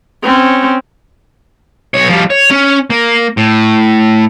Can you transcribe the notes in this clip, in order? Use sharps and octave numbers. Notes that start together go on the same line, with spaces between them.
C4 C#4
B1 C#5
F3 G3
C#5
C#4
A#3
A2